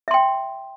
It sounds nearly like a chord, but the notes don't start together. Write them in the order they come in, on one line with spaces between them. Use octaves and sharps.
E5 C6 G5